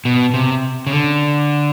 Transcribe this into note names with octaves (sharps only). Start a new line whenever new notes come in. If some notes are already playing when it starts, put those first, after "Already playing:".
B2
C3
C#3
D3